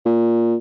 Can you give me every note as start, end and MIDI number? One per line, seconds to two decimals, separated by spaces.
0.05 0.55 46